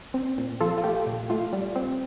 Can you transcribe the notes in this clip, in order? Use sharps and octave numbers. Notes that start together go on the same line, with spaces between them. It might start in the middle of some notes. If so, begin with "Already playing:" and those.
C4
A#2
F3 F4 A4
F4
A3 G4
A#2
A3 F4
G3
C4